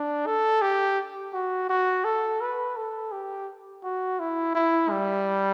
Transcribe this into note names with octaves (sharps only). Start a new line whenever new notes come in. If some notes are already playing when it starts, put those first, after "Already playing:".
Already playing: D4
A4
G4
F#4
F#4
A4
B4
A4
G4
F#4
E4
E4
G3